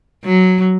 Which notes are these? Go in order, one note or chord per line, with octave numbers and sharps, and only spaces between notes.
F#3